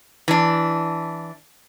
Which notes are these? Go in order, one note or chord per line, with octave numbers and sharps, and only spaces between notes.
E3 D4